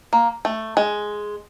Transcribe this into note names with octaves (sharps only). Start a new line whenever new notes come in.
A#3
A3
G#3